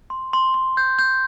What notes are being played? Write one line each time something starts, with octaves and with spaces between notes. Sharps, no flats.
C6
C6
C6
G6
G6